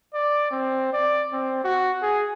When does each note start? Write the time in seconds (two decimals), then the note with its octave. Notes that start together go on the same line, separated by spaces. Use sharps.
0.14 D5
0.51 C4
0.93 D5
1.33 C4
1.64 F#4
2.02 G#4